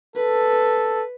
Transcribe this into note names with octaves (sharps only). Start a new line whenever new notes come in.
A4 B4